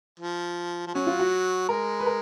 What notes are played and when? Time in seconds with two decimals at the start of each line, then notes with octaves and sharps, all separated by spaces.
0.20 F3
0.87 F3
0.94 F#3 C#4
1.07 F4
1.19 F#4
1.69 G#3 A#4
2.00 B4
2.06 A#4